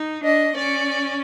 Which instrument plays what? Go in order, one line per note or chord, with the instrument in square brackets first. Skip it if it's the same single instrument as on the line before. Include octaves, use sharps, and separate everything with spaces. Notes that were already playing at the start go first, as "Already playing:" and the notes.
Already playing: [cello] D#4
[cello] D4 [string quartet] D#5
[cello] C#4 [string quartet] D5